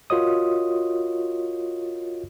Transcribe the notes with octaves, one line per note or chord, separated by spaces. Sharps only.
F4 F#4 A#4 C#5 D#5 D#6